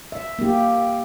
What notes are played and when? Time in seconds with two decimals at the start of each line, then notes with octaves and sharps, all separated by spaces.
0.12 E5
0.39 A#3 G4